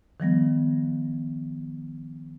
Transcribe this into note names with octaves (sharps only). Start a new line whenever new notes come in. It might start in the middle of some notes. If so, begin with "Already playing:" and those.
D#3 F3 G3 B3